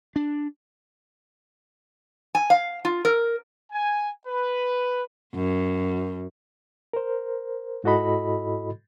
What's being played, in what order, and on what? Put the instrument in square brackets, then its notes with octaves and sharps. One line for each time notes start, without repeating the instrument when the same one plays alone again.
[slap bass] D4
[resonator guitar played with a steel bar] G#5
F5
F4
A#4
[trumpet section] G#5
B4
[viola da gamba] F#2
[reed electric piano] A#4 C5
G#2 E4 F#4 A4 D#5 B5